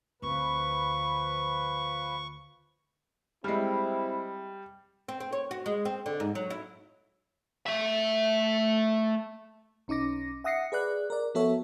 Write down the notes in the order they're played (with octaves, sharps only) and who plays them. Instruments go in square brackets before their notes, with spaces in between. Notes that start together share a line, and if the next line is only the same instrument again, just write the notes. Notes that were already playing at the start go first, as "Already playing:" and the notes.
[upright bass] D2 C4 [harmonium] F3 B4 [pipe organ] C#6
[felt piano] G3 G5 C7 [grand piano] G#3 F6 [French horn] C4 [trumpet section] E4
[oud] C4
C4
C#5
F#4
G#3
C4
D3
G#2
F#3
E4
[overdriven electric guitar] A3 E5
[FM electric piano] B1 C#4 D#4 D6 A#6
E5 F#5 D#6 A#6 C7 C#7
G#4 B4 D5 F#6
A#4 D5
F3 B3 F#4 A4 C#5 E5